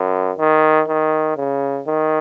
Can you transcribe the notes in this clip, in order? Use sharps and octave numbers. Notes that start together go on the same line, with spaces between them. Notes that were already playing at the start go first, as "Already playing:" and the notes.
Already playing: F#2
D#3
D#3
C#3
D#3